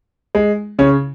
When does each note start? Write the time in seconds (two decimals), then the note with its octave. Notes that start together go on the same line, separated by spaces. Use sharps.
0.35 G#3
0.79 C#3 C#4